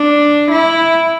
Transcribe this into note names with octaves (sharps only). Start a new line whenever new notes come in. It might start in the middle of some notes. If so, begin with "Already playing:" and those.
Already playing: D4
E4